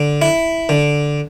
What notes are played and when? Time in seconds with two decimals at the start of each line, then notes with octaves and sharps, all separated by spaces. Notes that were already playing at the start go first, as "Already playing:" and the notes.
Already playing: D3
0.22 E4
0.69 D3